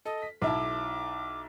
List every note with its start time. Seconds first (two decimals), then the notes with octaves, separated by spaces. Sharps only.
0.05 A4 D#5
0.22 B6
0.42 B1 E4 A5 D6